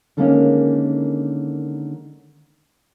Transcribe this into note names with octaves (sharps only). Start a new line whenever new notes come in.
D3 D#3 G#3 A#3 C4 C#4